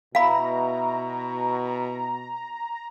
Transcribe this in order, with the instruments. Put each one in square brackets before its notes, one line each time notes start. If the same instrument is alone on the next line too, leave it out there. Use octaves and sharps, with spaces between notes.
[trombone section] B2 [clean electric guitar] E4 [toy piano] F5 B5 [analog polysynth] A#5